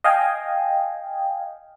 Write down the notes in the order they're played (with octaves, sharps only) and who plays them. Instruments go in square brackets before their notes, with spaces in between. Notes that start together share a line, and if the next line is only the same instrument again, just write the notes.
[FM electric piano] D#5 F5 G5 G#5